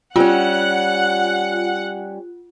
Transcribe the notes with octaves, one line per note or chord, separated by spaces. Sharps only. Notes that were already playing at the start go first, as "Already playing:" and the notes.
G3 C#4 F4 F#5